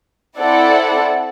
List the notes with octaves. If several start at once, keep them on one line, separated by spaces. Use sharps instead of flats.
C4 E4 A4 D5 F#5